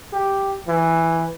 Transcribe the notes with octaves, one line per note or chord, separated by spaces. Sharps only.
G4
E3